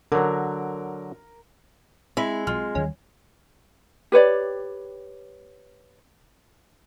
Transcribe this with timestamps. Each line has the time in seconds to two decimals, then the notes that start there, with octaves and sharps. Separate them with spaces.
0.12 D3 F#3 A#4
2.17 G#3 C4 E4 B5
2.47 B1 F4
2.75 D#2 D#3 G3 C#4
4.12 G4 B4 C#5 D5